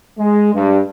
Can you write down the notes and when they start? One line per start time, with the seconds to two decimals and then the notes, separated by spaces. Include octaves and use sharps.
0.18 G#3
0.54 G2